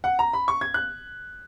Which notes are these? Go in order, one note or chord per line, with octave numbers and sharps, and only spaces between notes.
F#5
A#5
B5
C#6
G#6
F#6